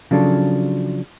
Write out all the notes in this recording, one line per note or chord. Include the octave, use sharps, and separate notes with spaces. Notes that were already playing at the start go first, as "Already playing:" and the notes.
C#3 F3 F#3 D4 A4